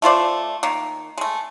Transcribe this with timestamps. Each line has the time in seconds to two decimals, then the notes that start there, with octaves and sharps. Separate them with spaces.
0.02 A3 F4 C5 D5
0.63 D#3 A#3
1.18 G#3 A3